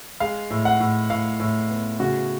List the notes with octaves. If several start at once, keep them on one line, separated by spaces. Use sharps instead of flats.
G#3 F5
A2
F#5
A2
A2 F5
A2
B3
C#3 F#4